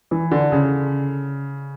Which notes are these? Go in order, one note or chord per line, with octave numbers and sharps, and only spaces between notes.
E3
D3
C#3